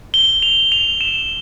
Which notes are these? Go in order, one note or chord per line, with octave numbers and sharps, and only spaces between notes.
G7
F7
F7
E7